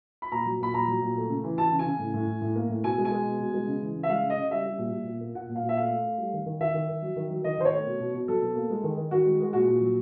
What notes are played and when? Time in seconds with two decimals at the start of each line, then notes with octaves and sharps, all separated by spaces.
0.22 B5
0.32 A#2 A#5
0.46 F#3
0.60 A#2 B5
0.74 A#2 A#5
0.88 F#3
1.02 A#2
1.16 A3
1.30 C#3
1.44 E3
1.58 E3 A5
1.72 C#3
1.79 G#5
1.86 C#3
1.99 A2
2.14 A2
2.27 A2
2.42 A2
2.56 A#3
2.69 A2
2.84 B2 G#5
2.98 G#3
3.05 G#5
3.11 G#3
3.25 B2
3.39 B2
3.54 G#3
3.67 C#3
3.81 E3
3.95 C#3
4.03 E5
4.09 G#3 F5
4.23 C#3
4.30 D#5
4.37 C#3
4.51 G3 E5
4.66 G3
4.78 A#2
4.92 A#2
5.07 A#2
5.21 A#3
5.35 A#2 F#5
5.49 A#2
5.56 F5
5.63 A#2
5.69 E5
5.77 A3 F5
5.91 A3
6.04 A3
6.18 G3
6.33 D#3
6.46 D#3
6.61 D#3 E5
6.74 D#3
6.89 D#3
7.02 F#3
7.16 D#3
7.31 F#3
7.44 D#3 D#5
7.58 D#3 C5
7.65 C#5
7.72 A3
7.86 B2
8.00 B2
8.14 B2
8.28 F#3 A4
8.42 B2
8.56 A#3
8.70 G#3
8.84 D#3
8.97 D#3
9.11 D#3 F#4
9.26 G#3
9.40 G#3
9.53 A#2 F#4
9.68 A#2
9.82 F#3